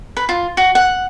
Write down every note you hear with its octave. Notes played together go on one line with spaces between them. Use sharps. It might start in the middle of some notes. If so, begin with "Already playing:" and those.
B4
F4
F#4
F#5